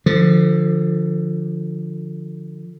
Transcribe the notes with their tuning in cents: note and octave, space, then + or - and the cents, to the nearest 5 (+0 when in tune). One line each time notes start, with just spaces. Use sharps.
D3 +20 F3 +0